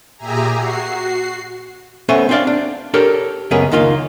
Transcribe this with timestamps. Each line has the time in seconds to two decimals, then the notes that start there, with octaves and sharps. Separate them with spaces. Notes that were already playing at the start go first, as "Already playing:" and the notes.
0.17 A#2 G4 G#4 E5 G#5 A#5
0.55 F#4 C7
2.09 A3 B3 C#4 A4 C5 G#5
2.29 C4 D4 C5 D5 F5
2.47 D4
2.94 D4 G4 A4 A#4 C#5
3.51 C#2 F#2 B3 C#4 G#4 A#4
3.72 C#2 D#3 A#3 F4 F5